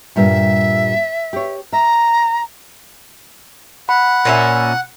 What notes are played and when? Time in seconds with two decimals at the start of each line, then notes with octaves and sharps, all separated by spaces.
0.16 G2 A#2 G3 E5
1.33 G4 C#5
1.72 E5 A#5
3.89 F#5 B5
4.25 A#2 C#4 E5